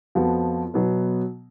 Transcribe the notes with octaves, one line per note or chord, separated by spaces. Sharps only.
F2 F3 B3 F#4
B2 F#3 B3